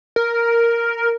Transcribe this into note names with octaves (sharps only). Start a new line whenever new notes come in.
A#4